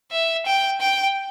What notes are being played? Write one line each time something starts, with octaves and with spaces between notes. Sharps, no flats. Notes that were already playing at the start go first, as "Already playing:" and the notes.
E5
G5
G5